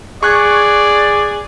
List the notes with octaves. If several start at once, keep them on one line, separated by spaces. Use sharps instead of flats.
G#4 D5 C#6 F#6 G#6